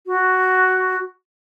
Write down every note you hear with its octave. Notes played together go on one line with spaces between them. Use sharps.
F#4